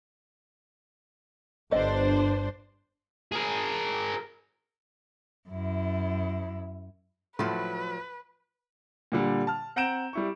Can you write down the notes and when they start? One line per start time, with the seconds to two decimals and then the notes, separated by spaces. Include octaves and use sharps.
1.71 G1 B3 D4 A4 C5 D#5
3.32 G#4 A#4
5.49 F#2 E4
7.39 A2 F3 F#3 B4
9.12 A#2 D3 G3
9.47 A5 F6
9.76 C4 F#5 A#5 G6 D7 E7
10.13 G3 E4 C#6